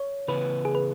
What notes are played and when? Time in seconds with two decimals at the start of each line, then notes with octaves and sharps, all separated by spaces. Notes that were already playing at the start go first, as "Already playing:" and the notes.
Already playing: C#5
0.28 C#3 E3 B3 E4 B4
0.65 G#4
0.75 B4